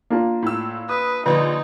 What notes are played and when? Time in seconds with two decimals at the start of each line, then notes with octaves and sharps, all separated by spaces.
0.10 A#3 D4 F4
0.42 A2 E6
0.89 B4 D#6
1.26 A#1 D3 D#4 B4